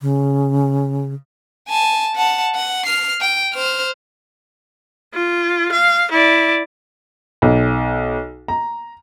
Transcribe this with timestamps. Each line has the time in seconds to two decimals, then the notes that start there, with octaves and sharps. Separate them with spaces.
0.01 C#3
1.69 G#5 A5
2.16 F#5 A5
2.55 F#5
2.86 F6 C7
3.20 G5
3.54 C5 F6
5.14 F4
5.72 F5
6.11 E4 D5
7.42 B1
8.48 A#5